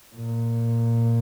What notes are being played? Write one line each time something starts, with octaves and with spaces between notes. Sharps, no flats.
A#2